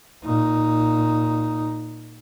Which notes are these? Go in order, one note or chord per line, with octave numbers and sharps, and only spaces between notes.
A#2 D#4